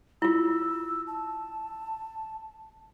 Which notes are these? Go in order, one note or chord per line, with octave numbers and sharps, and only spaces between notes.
E4 F4 E6
A5